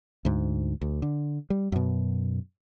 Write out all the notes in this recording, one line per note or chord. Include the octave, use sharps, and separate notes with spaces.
D2 G#2
D2
D3
G3
F#2 B2